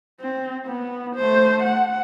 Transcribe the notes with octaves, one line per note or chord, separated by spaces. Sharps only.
C4
B3
A3 C5
F#5